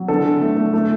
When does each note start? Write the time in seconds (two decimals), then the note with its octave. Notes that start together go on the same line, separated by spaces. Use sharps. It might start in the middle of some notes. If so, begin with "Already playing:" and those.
Already playing: F#3
0.08 D3 A4
0.26 D3
0.42 A3
0.57 A3
0.74 A3